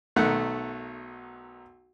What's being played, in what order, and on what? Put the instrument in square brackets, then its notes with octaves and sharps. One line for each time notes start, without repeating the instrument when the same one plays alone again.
[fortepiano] B1 D#3 A3 F#5